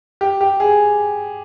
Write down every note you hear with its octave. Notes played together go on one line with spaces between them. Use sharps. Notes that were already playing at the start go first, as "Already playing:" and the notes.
G4
G4
G#4